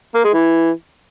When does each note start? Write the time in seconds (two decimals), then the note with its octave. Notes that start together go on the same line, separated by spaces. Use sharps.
0.15 A#3
0.24 G#3
0.34 E3